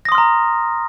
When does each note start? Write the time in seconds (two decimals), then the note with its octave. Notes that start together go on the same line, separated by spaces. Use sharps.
0.05 A#6
0.09 D#6
0.12 C6
0.15 F6
0.18 A#5